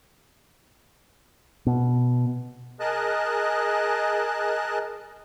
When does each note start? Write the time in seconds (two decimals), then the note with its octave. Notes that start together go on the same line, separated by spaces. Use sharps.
1.66 B2
2.80 G#4 A#4 D#5 A5 F#6